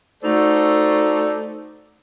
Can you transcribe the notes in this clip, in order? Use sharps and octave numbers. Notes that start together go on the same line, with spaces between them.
A3 D#4 F#4 A4 C5 D5